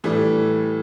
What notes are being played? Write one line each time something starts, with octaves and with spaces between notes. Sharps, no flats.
A2 E3 G3 A4